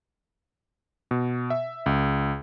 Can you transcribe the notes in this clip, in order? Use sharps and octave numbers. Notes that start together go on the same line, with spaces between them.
B2
E5
C#2